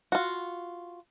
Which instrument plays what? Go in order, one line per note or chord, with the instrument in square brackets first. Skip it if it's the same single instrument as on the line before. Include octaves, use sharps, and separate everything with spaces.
[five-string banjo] F4 F#4